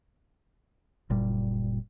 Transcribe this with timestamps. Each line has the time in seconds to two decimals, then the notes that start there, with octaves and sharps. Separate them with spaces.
1.10 F#1 A#2 G3